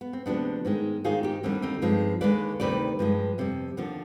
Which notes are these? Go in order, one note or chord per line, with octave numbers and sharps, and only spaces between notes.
B3
C4
D2 C3 F3 G#3 B3 D4
G#2 D#3 G#3
G#2 D#3 G#3 F4 G#4
D#4 G4
D#2 D3 G3 C4
C4 D#4
G2 F3 G#3
D#2 D3 G#3 B4 D5
D2 C3 D#3 G3 B4 D5
G2 F3 G#3
F2 C3 G3
D#2 D3 F3